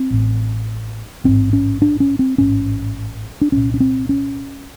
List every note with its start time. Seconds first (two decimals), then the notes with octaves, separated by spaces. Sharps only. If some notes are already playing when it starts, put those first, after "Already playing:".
Already playing: C4
0.11 A1 A2
1.24 A1 G#2 C4
1.53 C#4
1.82 D4
2.00 C#4
2.19 C4
2.38 A1 G#2 C#4
3.41 D4
3.52 C2 A#2 C#4
3.74 C#4
3.80 C4
4.09 C#4